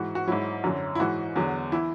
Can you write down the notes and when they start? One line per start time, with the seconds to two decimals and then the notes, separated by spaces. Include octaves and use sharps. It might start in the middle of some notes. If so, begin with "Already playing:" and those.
Already playing: G#2 E3 F#4
0.15 F#4
0.27 G#2 F#3 E4
0.64 F#2 D3 F#3
0.95 E4
1.00 G#2 E3 F#4
1.36 E2 D3 F#3
1.72 E3 E4